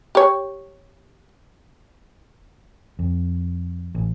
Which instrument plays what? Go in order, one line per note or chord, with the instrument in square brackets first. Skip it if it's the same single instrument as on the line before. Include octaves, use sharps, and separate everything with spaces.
[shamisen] G4 C#5
[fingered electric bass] F2
A1